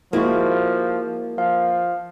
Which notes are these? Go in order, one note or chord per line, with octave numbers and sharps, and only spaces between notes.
F3 G#3 A#3 E4 F#4
F3 F5